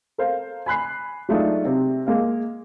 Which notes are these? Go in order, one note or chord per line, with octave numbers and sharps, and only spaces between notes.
A4 A#4 C5 F5
G#5 B5 F#6 C7
F#3 G#3 A3 D4 D#4 F4
C3 C4
G#3 A#3 F5